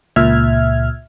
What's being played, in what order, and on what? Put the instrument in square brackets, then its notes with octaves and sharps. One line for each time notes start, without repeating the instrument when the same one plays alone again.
[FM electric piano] C#2 A#2 E5 F6 G#6